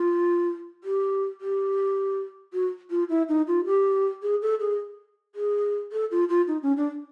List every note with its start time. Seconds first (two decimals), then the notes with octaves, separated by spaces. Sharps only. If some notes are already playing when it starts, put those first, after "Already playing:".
Already playing: F4
0.84 G4
1.41 G4
2.53 F#4
2.90 F4
3.09 E4
3.29 D#4
3.47 F4
3.66 G4
4.22 G#4
4.42 A4
4.60 G#4
5.35 G#4
5.92 A4
6.11 F4
6.29 F4
6.48 D#4
6.63 C#4
6.77 D4